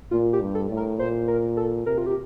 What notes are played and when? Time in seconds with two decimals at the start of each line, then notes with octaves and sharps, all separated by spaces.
0.11 A#2 F4
0.33 G4
0.41 G2
0.55 A4
0.70 A2
0.77 A#4
0.98 A#2 C5
1.28 A#4
1.57 A4
1.86 C3 A#4
1.98 F4
2.06 G4